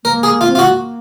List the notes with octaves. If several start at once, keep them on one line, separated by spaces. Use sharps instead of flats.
A#3 A#4
G#4
F4
C4
F4
A#3 F#4